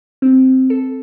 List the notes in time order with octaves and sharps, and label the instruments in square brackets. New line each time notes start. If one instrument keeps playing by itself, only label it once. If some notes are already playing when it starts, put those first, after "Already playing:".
[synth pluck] C4
A4